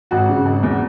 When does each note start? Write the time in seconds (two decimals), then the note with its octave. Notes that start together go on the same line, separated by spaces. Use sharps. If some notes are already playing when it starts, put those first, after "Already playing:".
0.11 G#1 F#4
0.29 C#3
0.46 G#1
0.63 E2